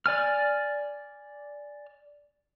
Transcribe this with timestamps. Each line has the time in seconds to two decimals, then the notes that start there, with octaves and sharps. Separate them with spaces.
0.06 D5 G#5 F6